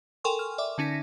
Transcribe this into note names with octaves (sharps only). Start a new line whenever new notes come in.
A4 A#4 G5 G#5 C6 C#6
F6
D5 E5 D6
D3 C#4 D#4 A#6 B6